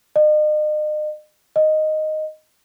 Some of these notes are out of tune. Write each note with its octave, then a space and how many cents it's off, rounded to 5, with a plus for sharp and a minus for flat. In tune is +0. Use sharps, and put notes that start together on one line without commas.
D#5 -40
D#5 -5